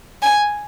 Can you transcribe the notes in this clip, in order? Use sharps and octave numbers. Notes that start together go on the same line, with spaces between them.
G#5